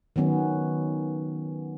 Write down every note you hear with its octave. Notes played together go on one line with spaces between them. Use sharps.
D#3 F#3 B3 C#4